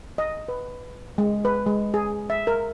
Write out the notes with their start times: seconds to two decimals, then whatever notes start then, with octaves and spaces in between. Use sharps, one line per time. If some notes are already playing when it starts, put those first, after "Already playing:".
0.18 D#5
0.48 B4
1.18 G#3
1.45 B4
1.67 G#3
1.94 G#4
2.30 E5
2.47 A#4